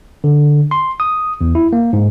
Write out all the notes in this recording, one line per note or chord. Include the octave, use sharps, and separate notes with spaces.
D3
C6
D#6
E2
E4
A#3
G#2